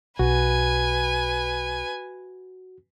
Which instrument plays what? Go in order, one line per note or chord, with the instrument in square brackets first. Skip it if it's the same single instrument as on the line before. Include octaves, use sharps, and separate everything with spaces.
[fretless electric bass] B1 [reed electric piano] F#4 [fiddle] B4 G#5